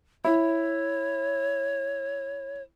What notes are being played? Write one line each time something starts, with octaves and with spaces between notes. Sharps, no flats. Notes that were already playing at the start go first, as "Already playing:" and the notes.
E4 C#5